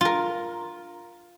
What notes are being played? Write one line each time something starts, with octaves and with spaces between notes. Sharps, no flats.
F4 A#4